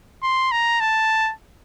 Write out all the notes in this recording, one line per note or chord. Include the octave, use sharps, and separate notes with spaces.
C6
A#5
A5